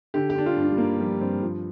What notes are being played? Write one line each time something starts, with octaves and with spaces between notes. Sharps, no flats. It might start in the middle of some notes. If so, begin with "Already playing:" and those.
D3 G4
G4
D3 D4
F4
G2
D4
G3
G2 A#3
F3 G3
G2 C4
F3